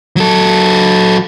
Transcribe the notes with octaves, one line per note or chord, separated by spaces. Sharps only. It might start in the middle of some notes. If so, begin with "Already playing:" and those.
F#3 A4